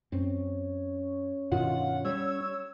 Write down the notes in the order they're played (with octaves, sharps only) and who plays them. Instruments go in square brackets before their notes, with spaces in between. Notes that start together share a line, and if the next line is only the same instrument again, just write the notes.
[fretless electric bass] F#2 C4 [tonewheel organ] C#4
[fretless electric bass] G2 B2 D#3 [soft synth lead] F4 [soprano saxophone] F#5
[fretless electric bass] G3 [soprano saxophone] C#5 [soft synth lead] E6